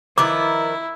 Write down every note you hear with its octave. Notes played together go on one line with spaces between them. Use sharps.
D#3 F3 E4 B4 D6